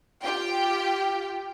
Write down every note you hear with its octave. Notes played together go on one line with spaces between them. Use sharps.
F4 G4 G5